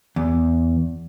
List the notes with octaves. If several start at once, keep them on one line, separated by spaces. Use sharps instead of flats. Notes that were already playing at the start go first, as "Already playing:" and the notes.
E2